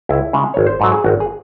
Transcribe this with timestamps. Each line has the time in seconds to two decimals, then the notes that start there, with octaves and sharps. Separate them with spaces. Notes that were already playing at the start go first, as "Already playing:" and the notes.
0.09 C#2 E4
0.33 C#3 G#3
0.54 G#1 C#5
0.67 C5
0.80 G#2 F#3 A4
0.92 G#4
1.04 G#1 F#4
1.20 G#4